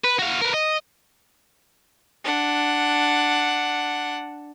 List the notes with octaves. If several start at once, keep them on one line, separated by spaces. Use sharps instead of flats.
B4
F#4 F5
A#4 B4
D#5
D4 F#5